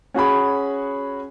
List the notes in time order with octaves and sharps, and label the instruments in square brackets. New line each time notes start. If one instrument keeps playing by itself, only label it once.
[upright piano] C#4 F#4 G#4 B5